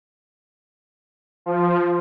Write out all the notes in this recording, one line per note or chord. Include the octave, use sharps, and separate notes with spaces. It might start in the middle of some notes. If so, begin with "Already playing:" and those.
F3